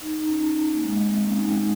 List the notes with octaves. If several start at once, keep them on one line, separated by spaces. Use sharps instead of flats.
D#4
D#4
C#4
A#3
G#3
A#3
C4
A#3
C#4
D#4
G#3